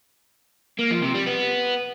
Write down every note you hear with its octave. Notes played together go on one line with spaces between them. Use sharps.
A#3
F3
C3
G3
B3